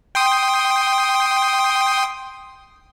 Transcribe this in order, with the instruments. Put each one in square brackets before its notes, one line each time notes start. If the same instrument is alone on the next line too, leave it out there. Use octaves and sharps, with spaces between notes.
[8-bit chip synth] G5 C6 D#6